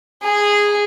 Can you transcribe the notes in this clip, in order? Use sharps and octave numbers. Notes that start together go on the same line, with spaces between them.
G#4